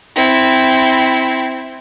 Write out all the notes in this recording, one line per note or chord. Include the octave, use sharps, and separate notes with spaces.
C4 E4